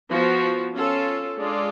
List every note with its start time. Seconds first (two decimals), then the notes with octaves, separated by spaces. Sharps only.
0.10 F3 B3 F#4
0.74 C#4 F4 A4
1.38 G#3 D4 F4 A4 D5